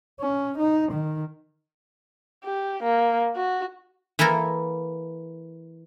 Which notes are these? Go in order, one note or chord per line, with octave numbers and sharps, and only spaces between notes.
C#4
D#4
D#3
G4
A#3
F#4
E3 A#3 E4 A4 A#4